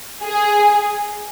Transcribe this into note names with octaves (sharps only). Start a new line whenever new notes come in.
G#4